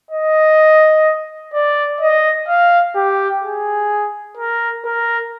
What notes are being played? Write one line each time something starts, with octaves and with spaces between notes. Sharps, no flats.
D#5
D5
D#5
F5
G4
G#4
A#4
A#4